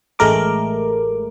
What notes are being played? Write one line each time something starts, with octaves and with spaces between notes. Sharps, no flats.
A1 G#3 A3 A#4 D6